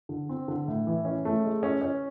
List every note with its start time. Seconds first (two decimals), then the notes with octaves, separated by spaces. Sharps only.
0.09 D3
0.29 C4
0.48 D3
0.68 A2
0.87 E3
1.05 C#4
1.25 A3
1.44 G#3
1.63 C#4
1.82 C#4